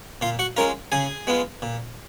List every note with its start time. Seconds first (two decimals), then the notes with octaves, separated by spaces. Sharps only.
0.21 A#2 F4 F5
0.39 F#4 F#5
0.57 G#3 C#4 F4 A#4 A#5
0.92 C#3 G#4 G#5
1.27 G#3 B3 F4
1.62 A#2